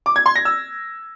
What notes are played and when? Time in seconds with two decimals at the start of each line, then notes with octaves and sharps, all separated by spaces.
0.06 D6
0.16 G#6
0.26 C6
0.36 A#6
0.45 E6